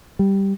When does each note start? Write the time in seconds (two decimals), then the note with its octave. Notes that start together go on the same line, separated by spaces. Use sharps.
0.19 G3